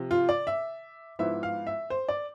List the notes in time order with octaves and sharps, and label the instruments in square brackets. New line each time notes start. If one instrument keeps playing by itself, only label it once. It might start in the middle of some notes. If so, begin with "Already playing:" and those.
Already playing: [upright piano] C3 F3
F4
D5
E5
G#2 F3 B3 E4 E5
F5
E5
C5
D5